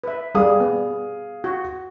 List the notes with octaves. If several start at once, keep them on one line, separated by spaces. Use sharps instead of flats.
B4 E5
G3 G#4 F5 D#6
B3
F#4